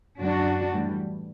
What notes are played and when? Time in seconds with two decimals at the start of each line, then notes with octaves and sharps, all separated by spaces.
0.20 F#2 D3 F#3 D4 F#4
0.71 A2 E3 G3